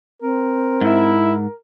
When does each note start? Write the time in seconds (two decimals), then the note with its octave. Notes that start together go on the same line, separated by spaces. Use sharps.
0.22 C4 A#4
0.81 G#2 E4